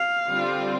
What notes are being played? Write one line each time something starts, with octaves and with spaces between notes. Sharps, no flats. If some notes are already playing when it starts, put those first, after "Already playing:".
Already playing: F5
D3 G3 C4 F4